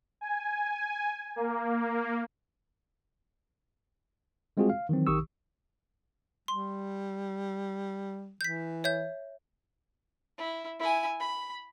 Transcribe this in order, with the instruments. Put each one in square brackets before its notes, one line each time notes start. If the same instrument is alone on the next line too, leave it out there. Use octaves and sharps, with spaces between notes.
[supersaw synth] G#5
A#3
[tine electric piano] G3 G#3 C4 F4 F#4 G#4
F5
D#3 E3 F#3 C4
A#1 D#3 G4 C#6 D#6 E6
[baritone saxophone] G3 [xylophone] C6
[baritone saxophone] E3 [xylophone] G6 B6
[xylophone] C#5 E5 G6
[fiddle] E4
E4 G#5
B5